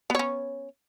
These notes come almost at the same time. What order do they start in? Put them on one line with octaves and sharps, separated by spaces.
B3 C#5 C#4